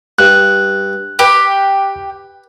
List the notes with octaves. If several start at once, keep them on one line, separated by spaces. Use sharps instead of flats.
G2 F#6
G4 B4